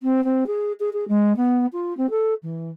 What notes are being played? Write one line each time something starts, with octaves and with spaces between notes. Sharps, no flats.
C4
C4
G#4
G#4
G#4
G#3
B3
F4
C4
A4
E3